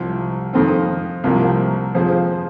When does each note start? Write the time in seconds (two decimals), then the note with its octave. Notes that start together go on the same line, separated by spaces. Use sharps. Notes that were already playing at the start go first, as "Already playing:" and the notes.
Already playing: C2 C3 F3
0.53 F2 D#3 C4
1.24 C2 C3 F3 A#3
1.94 F2 F3 C4 G#4 C5